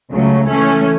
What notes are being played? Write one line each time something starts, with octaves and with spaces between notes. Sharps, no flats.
C#2 C#3 F#3 A3
E3 A3 C#4